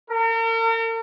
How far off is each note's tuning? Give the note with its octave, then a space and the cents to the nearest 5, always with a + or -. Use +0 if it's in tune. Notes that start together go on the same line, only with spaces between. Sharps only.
A#4 -40